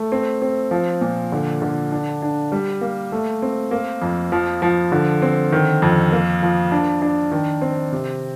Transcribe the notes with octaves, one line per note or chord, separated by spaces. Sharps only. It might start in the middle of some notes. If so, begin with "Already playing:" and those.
Already playing: A3
C4
C4
F3
A#2
D3
D3
D4
D4
G3
A#3
A3
C4
A#3
F2
F3
F3
D3
C4
D#3
F2
A#3
F3
D4
D4
D#3
C4
C3